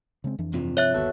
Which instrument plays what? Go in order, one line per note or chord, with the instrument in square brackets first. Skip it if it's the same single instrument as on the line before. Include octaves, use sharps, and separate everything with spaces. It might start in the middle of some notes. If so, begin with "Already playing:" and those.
[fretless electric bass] C#3 G#3 C4
F2 E3 D4
[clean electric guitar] G2 C3 F3
[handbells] C#5 E5 F#6
[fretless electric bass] G1 D#2 [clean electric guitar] B3 F#4 A4